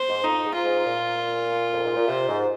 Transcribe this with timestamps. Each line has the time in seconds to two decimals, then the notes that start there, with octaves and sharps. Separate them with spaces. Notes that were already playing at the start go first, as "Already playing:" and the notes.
Already playing: C5
0.09 G#2
0.24 F2 D#4
0.44 G#2
0.55 F4
0.65 G#2
0.85 A#2
1.73 F2
1.85 G#2
1.96 A#2
2.08 C3 C5
2.29 G#2